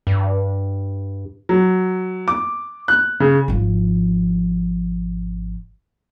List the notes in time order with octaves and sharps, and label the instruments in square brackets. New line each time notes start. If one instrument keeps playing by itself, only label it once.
[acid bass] G2
[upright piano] F#3
D6
F#6
C#3
[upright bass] G#1 F3